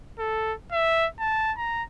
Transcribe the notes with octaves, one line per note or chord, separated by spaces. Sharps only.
A4
E5
A5
A#5